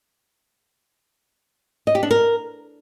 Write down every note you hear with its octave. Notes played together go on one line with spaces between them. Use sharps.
D#5
G4
D4
A#4